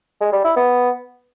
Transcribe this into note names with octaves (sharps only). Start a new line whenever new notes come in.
G#3
G3
E4
B3